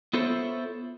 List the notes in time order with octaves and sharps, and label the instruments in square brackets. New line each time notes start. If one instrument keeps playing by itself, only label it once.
[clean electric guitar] B3 E4 F4 A4 C5 C#5